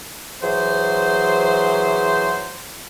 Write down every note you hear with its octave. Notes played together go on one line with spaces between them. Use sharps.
E3 F#3 G#4 C5